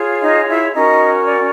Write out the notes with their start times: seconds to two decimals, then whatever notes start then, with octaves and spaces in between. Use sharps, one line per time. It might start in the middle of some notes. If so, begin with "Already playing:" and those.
Already playing: F4 G#4 C#5
0.22 D#4 D#5
0.48 E4 E5
0.73 C#4 D#4 F#4 A#4 D#5
1.26 D5